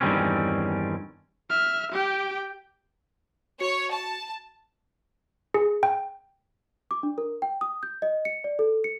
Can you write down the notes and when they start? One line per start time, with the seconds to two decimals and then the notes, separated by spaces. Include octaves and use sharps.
0.01 E2 G2 D#3 G3 C4 C#4
1.50 E5 F6
1.92 G4 G5
3.60 F#4 C#5 C#7
3.92 A5
5.54 G#4
5.83 G5
6.91 D6
7.03 D4
7.18 A#4
7.42 G5
7.61 D#6
7.83 G6
8.02 D#5
8.25 C#7
8.44 D5
8.59 A4
8.84 C#7